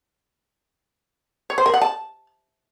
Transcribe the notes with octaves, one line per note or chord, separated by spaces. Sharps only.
C#5
C5
A#4
F#5
A5